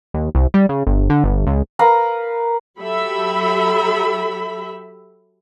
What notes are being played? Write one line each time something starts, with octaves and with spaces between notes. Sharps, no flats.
D#2
C2
G3
C#3
G1
D3
G1
C#2
A#4 B4 F5 A#5
F#3 G4 A4 E5 B5